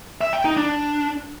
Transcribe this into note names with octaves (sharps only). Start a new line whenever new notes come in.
E5
G5
D#4
D4